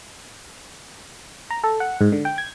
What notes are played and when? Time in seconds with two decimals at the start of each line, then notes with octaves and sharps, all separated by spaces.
1.50 A#5
1.64 A4
1.80 F#5
2.01 G#2
2.12 D3
2.25 G5
2.38 G#6